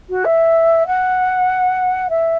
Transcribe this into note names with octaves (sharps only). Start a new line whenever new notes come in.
F#4
E5
F#5
E5